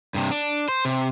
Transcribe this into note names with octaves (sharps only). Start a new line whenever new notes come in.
G2 C3
D4
C5
C3